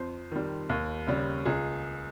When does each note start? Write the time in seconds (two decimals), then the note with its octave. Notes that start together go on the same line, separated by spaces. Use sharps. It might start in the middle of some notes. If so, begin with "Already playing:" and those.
Already playing: F2 C5
0.32 D#3 G3
0.69 D#2
1.07 C#3 G3
1.46 C#2 G#4